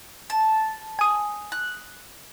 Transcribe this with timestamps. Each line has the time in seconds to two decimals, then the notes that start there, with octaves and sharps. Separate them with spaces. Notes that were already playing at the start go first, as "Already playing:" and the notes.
0.30 A5
0.99 G#5 D#6
1.52 F#6